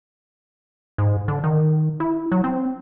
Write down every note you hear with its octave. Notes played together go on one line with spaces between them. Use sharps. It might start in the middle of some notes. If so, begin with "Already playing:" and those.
G#2
D3
D#3
E4
F#3
C4